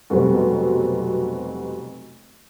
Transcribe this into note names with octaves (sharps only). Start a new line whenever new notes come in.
F1 B2 F#3 G3 C4